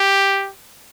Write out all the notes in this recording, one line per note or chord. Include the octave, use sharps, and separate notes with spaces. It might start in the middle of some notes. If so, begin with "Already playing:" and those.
Already playing: G4